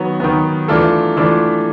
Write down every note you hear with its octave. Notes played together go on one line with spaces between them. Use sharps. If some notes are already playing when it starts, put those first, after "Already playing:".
Already playing: D#3 F#3 B3
D#3 F#3 B3
E3 A3 D4 F4 A4
E3 A3 D4 F4 A4